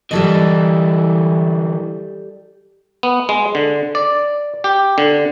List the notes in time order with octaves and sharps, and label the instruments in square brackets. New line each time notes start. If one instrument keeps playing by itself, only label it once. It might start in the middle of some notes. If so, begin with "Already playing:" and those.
[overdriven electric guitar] D3 E3 [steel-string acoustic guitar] G3 A4 D#5
[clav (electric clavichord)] B3
G#3
D3
D5
G4
D3